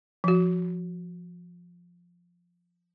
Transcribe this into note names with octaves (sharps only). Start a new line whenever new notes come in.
F3 F#4